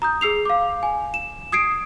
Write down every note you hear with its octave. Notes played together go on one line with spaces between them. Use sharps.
A#5 D#6 G6
G#4 E6 C7 F7
F5 D6
G#5
E7
D#6 G#6 C7 D7